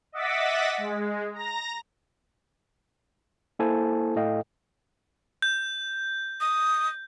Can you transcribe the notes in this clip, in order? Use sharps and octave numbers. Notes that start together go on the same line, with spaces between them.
D#5 E5 F#5 D6 A6 B6
G#3
A#5 A#6
A#3 E4 A4 C5 G#5 A5
A2 A4 D#5 F5 G5
G6
D#6